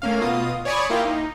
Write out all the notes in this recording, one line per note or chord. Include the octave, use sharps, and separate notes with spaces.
A3 A#3 C#4 F5
B2 F4 D#6
C#5 D5 G#5 B5 C#6 D#6
A#3 E4 F4 G4
D#4